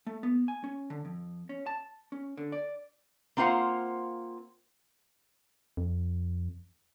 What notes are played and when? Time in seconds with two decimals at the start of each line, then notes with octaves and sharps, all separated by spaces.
0.07 A3
0.23 B3
0.48 G#5
0.64 C#4
0.90 D3
1.05 F2
1.49 C#4
1.66 A5
2.12 C#4
2.37 D3
2.52 D5
3.37 A#3 C4 F4 C5 F5 F#5
5.77 F2